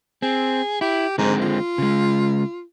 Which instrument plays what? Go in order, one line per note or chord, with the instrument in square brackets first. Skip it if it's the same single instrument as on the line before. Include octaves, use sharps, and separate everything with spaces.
[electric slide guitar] C4 [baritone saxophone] G#4
[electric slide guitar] E4 [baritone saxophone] G4
[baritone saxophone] G#2 [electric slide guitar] D3 G#3 C4
[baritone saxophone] F4
[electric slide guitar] C#3 G#3